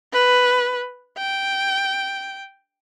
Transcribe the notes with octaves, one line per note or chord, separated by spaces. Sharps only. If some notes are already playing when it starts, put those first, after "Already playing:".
B4
G5